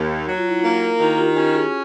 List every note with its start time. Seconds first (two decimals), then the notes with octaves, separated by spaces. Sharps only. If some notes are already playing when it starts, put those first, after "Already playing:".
Already playing: D#2
0.27 F#3 F#4
0.38 F4
0.49 E4
0.59 A#3 D#4 F4
0.99 D#3 E4 F#4
1.18 F4 G4
1.36 C#4 F4 G4
1.54 F#4 G#4